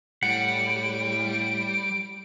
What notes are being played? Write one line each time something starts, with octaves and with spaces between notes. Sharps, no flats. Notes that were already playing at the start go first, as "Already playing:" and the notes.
A2 G3 F#5 D7